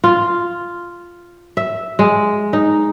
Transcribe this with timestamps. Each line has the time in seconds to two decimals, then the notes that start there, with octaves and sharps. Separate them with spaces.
0.04 F4
1.57 E5
1.99 G#3
2.53 D#4